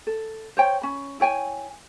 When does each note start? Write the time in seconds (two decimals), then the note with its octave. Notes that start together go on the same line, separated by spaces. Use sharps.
0.07 A4
0.57 C5 C#5 G5
0.82 C#4 B5
1.20 E4 C#5 G5 G#5